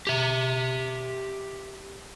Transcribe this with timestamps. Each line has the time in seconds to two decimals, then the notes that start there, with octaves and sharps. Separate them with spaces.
0.07 G4 E5